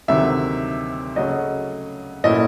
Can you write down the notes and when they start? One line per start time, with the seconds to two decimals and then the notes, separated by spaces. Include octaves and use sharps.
0.08 D2 C3 D#3 F#3 E5
1.16 C#3 F#3 A3 C#4 D#5
2.24 A#2 F#3 A3 C#4 E4 D#5